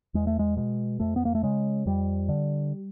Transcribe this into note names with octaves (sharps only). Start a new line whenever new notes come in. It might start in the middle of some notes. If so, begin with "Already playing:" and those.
E2 G#3
A3
G#3
B2 G#3
F2 A3
B3
A#3
A3
C#3 G#3
F2 G3
D3